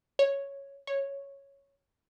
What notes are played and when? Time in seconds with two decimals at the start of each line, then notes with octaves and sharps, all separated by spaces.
0.19 C#5
0.87 C#5